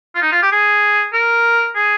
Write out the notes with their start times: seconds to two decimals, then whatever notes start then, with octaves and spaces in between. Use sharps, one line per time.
0.15 F4
0.22 D#4
0.32 F4
0.43 G4
0.52 G#4
1.14 A#4
1.76 G#4